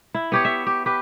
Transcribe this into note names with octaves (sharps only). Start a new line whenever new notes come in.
E4
B3 G4 C#5
E5
G4
G4 B4